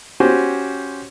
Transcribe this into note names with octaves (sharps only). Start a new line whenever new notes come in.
C#4 F#4 G4 C5